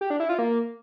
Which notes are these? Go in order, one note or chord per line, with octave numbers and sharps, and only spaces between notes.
G4
D4
E4
F4
A#3